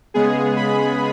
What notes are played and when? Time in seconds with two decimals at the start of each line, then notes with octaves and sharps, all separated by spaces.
0.14 C#3 G#3 B3 G#4
0.57 B5